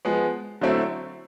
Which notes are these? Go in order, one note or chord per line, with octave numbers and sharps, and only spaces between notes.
F3 G#3 B3
D3 F#3 A3 C4 E4